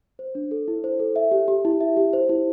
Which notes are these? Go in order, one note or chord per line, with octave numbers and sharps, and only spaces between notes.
C5
D4
A4
E4
C5
A4
E5
G4
G4
E4
E5
G4
C5
E4